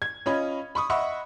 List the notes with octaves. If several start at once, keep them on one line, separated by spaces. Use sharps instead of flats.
G#6
C#4 F4 C#5 D#5 B5
B5 C#6 D#6
D#5 E5 F#5 B5 C#6 E6